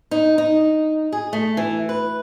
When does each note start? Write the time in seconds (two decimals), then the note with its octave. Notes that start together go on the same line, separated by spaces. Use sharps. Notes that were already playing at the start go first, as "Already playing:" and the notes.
0.11 D#4
0.38 D#4
1.13 G#4
1.33 A3
1.57 E3
1.89 B4